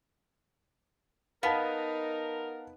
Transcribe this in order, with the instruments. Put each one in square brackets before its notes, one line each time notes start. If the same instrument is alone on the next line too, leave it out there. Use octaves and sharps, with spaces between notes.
[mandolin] B3 [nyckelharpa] D#4 [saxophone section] A#4 [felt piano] F5 F#5 A5